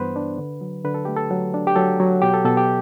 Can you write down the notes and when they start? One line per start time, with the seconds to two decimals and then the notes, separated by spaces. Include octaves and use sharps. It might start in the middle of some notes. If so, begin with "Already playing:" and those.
Already playing: G2 E3 B3 B4 C5
0.16 D4
0.38 D3
0.61 F#3
0.85 D3 B4
0.94 A4
1.05 A3 G4
1.16 A4
1.31 F#3
1.54 D4
1.67 G4
1.76 F#3 A4
2.00 F#3
2.22 B2 G4
2.34 A4
2.45 B2 A4
2.57 G4